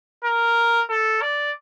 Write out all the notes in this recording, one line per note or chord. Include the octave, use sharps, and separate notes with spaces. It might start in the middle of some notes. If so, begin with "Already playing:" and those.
A#4
A4
D5